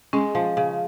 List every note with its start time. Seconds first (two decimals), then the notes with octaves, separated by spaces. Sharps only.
0.13 G#3 C#4
0.35 F3
0.57 C#3